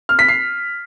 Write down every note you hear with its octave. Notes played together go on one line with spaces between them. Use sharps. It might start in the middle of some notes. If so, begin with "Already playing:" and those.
F6
B6
C7